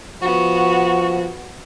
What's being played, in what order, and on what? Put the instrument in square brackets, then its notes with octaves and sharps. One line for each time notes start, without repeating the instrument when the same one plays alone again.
[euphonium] F3 [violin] B3 F#4 [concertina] C#6